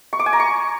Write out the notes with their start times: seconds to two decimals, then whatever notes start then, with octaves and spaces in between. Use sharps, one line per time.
0.13 C#6
0.19 D6
0.26 G#5
0.33 A#5
0.40 C#6